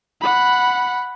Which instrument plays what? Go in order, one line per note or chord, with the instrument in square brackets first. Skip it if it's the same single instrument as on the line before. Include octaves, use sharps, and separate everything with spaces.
[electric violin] F#5 B5